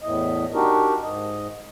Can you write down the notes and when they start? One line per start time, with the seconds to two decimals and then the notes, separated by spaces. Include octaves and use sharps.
0.01 E2 A2 D#5
0.54 D4 D#4 F#4 G4 A#4
1.02 G#2 D#5